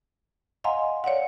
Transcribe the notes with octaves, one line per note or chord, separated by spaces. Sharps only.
D#5 F5 F#5 G#5 A#5 C6
C#5 D5 F5 F#5